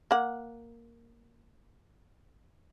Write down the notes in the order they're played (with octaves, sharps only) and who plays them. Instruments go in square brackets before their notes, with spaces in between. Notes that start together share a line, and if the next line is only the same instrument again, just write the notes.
[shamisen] A#3 F#5